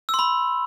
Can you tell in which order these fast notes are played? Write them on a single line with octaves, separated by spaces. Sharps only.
E6 C6 B5